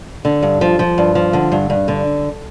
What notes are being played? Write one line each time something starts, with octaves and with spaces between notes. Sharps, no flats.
D3
G2
F3
F3
G2
F3
D3
G2
G2
D3